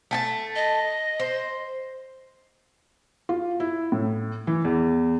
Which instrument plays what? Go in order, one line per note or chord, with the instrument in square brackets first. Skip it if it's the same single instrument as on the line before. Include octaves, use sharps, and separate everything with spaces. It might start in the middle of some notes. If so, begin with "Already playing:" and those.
[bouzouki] A3 G#5 A5
[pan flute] D#5
[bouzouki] C5
[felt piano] F4
E4
A2
E3
E2